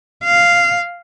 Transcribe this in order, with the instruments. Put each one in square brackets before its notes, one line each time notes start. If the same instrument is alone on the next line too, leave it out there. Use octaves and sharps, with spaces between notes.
[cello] F5